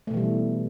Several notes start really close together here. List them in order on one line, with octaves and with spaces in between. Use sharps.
A3 B2 E3 G3